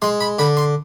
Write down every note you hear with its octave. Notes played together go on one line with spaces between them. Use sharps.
G#3 C6
B5
D3 B5
C6